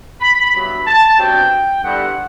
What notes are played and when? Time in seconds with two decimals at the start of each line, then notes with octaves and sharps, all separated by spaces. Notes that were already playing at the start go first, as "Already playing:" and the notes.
0.21 B5
0.54 G2 F#3 B3 E4 B5
0.87 A5
1.18 C3 F#3 B3 D4 G5
1.83 G2 D3 G3 B3 E4 F#5